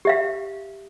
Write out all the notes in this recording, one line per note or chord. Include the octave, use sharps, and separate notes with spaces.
G4 E5 F5